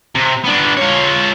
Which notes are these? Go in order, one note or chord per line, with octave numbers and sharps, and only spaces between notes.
C3
B3 D4
F4 C#5